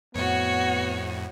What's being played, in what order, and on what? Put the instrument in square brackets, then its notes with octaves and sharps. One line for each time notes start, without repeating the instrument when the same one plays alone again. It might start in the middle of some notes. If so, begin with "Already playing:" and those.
[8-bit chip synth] F2 A2 [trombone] B3 [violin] F#4 C#5